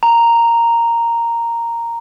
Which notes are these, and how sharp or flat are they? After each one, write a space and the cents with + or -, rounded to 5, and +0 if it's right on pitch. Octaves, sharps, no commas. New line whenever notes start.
A#5 -5